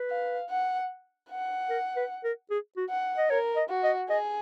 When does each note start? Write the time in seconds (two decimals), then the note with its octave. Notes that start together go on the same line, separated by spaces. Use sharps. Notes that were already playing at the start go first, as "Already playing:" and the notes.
Already playing: B4
0.10 F5
0.50 F#5
1.30 F#5
1.70 A#4
1.96 B4
2.24 A#4
2.51 G#4
2.77 F#4
2.90 F#5
3.17 D#5
3.30 A#4 C#5
3.56 D#5
3.69 F#4
3.84 D#5
4.10 G#4 D#5